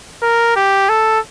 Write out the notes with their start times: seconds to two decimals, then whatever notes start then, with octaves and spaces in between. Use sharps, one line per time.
0.23 A#4
0.56 G4
0.89 A4